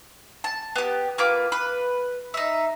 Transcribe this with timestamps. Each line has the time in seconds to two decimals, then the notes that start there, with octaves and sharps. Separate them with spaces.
0.44 A5
0.76 B3 G4
1.18 A#3 F4 B4 D6
1.52 B4
2.34 D#4 E5